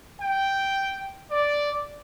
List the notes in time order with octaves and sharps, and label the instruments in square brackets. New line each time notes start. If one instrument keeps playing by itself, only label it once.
[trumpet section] G5
D5